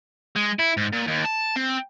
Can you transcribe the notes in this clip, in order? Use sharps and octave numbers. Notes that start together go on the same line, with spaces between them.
G#3
E4
G#2
A#2
D#2
A5
C4